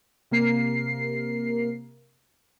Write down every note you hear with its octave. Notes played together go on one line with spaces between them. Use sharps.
C3 A#3 A#4 C7